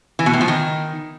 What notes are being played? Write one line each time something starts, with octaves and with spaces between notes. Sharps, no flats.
E3
B2
A2
F3
D#3